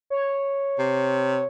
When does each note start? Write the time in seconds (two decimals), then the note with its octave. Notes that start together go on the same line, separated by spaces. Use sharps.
0.10 C#5
0.79 C3